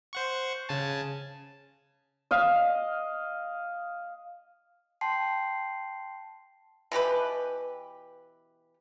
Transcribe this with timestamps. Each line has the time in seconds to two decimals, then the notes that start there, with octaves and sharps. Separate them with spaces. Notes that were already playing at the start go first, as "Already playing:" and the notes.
0.13 C5 F#5 C#6
0.69 C#3 G#5 A5
2.31 D#5 F5
5.01 G5 A5 C6 C7
6.92 B2 E3 G4 B4